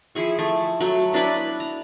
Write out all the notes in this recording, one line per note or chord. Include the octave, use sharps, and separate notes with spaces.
F3 E4 G#4 C#6
A3
F#3 A3
B3 D4 E4 B4
A#5